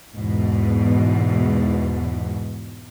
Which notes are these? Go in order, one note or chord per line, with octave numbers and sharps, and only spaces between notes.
E2 G#2 B2